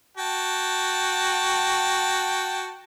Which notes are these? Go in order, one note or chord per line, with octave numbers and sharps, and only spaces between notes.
F#4 G5 A5